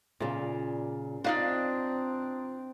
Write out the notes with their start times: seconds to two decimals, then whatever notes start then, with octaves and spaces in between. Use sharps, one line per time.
0.20 A#2 C#3 F4 D5
1.24 C4 D4 D#4 F4 F#4 D5 F5